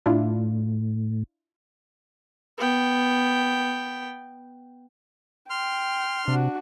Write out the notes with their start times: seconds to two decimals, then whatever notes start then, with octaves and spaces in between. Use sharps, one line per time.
0.06 A2 D4 E4 F4
2.58 B3 G5
5.50 G5 C6 F6
6.28 C3 D4 F#4